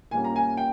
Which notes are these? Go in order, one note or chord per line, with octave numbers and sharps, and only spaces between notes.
A#2 G3 A#3 C#4 G#5
A#5
G#5
G5